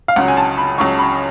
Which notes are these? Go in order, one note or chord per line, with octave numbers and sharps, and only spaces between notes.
F5
C#2 C#3 F#3 F#5
G#5
A5
B5
C#2 C#3 F#3 C#6
B5